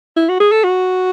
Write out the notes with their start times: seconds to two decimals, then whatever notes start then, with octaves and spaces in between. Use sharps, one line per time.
0.17 E4
0.29 F#4
0.40 G#4
0.52 A4
0.64 F#4